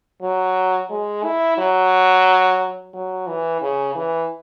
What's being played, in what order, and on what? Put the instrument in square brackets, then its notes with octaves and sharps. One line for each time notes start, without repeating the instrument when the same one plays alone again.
[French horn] F#3
G#3
E4
F#3
F#3
E3
C#3
E3